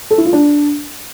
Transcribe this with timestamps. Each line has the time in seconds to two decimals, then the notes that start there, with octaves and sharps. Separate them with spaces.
0.11 A4
0.18 E4
0.25 F4
0.33 D4